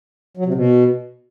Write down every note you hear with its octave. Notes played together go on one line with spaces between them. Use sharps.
F#3
C3
B2